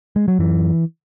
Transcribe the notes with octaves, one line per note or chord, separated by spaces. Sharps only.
G#3
F#3
F#2 E3